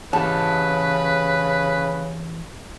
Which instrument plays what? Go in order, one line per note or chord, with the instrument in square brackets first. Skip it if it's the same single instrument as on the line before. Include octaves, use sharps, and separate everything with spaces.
[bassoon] C#3 [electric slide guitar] E3 G4 [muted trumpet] B4 [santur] A5